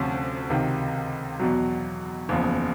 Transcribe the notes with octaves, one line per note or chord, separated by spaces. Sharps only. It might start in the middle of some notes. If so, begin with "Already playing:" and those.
Already playing: D2 C3 F3 C#4
C#2 C3 D#3
E2 B2 F#3
F#1 E2 C#3 F3